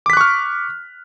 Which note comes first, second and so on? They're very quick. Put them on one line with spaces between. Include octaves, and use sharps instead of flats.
D6 B6 F#6 C#6 F6